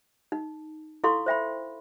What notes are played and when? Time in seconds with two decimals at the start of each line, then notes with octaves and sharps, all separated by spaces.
0.32 D#4
1.04 E4 A4 F5 C6 C#6
1.26 C5 E5 G5 B5